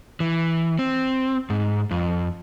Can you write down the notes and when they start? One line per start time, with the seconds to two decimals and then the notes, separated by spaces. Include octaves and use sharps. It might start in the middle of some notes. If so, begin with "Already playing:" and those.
0.20 E3
0.79 C4
1.50 G#2
1.91 F2